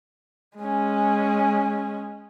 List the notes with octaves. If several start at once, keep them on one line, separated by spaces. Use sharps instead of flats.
G#3 C#4